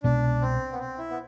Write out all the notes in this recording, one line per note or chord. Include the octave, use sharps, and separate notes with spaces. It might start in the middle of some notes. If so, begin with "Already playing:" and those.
C2 B2 G#3 B3 D4
C4
B3
C4
E4
B3